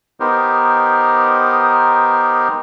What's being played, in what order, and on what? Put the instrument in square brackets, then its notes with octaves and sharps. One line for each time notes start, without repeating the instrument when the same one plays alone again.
[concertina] B3 D#4 G4 A#4 C5